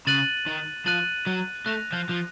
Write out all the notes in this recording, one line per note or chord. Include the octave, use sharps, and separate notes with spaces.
C#3 F#6 A6 D#7 F#7
D#3
F3 F#6 A6 D#7 F#7
F#3
A3 F#6 A#6 F7
F3
F3